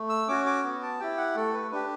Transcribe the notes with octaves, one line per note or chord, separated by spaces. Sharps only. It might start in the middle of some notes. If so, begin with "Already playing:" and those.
Already playing: A3
E6
C#4 F#4 D6
D6
B3
A5
E4 G4 G5
F#5
A3 A4
B4
D4 G4 B4